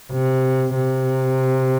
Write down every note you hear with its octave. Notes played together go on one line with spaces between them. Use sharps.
C3
C3